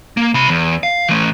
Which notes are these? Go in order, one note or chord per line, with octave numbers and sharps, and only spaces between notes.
A#3
C3 B5
E2
F5
E3 A3